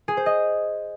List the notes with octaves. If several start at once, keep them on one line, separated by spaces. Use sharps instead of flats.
G#4
C5
D#5